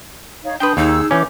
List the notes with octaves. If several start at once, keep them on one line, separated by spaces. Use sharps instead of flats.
D#4 C#5 F5
D4 B4 G5 C6 D#6 G6
D#2 D#4 G#4 E6
E3 C#4 D6 G6